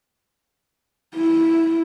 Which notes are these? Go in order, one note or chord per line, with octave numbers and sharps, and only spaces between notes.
E4